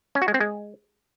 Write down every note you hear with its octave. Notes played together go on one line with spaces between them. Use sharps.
C#4
F#4
G#3
C4
G#3